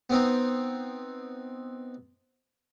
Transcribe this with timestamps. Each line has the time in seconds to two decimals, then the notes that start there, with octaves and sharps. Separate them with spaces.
0.10 B3 C4 D#4